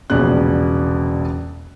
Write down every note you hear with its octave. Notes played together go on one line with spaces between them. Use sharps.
E1 A#1 C#3 C#4 F#6